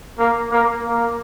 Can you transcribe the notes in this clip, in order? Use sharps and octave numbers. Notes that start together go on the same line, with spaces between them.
A#3
A#3
A#3